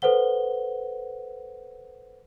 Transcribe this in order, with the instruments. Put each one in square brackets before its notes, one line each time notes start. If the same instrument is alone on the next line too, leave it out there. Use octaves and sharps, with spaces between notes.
[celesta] A4 B4 C5 F#5 G7